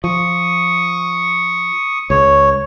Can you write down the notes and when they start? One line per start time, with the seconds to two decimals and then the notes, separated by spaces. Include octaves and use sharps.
0.04 F3 C#6 D#6
2.10 C#2 C#5